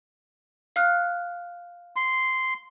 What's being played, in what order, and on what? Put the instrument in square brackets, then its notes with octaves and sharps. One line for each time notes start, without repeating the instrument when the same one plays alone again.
[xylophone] F5 F6 F#6
[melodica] C6